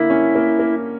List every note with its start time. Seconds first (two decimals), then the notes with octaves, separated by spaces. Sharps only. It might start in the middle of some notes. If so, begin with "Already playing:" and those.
Already playing: D3 A#3 E4
0.10 C#4
0.35 A#3
0.59 A#3